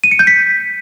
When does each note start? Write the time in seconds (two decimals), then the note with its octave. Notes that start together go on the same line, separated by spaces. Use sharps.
0.04 D#7
0.11 C#7
0.19 G6
0.27 B6